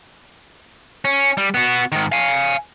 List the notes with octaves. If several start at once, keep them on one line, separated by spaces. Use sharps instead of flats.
C#4
G3
B3 F#4
G#2 D#3
F5 G#5